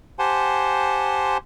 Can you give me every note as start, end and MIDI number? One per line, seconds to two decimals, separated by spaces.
0.19 1.37 67
0.19 1.37 72
0.19 1.37 78
0.19 1.37 80
0.19 1.37 81
0.19 1.37 84